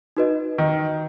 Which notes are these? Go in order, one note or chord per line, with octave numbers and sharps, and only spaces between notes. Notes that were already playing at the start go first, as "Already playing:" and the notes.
D#4 F#4 B4 D#5
D#3